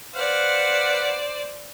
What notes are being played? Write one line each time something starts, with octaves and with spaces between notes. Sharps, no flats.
B4 C5 D5 F5 F#5